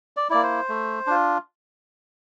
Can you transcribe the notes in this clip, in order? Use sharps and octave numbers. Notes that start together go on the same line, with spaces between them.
D5
A#3 E4 D5
C5
A3
D4 F4